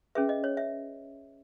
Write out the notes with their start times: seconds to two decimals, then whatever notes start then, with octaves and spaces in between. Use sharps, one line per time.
0.15 C#4 G#4 B4 E5
0.29 D#5
0.44 C#5
0.57 E5